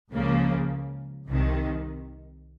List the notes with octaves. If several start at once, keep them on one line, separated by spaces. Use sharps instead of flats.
C#2 C#3 F3 A#3
C2 C3 D#3